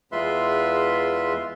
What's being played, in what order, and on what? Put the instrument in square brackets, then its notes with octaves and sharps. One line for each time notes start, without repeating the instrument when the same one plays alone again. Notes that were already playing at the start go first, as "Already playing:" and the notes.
[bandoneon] E2 G#3 F4 B4 E5 C6